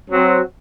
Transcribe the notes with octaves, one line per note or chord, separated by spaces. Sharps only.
F#3 C4 F#4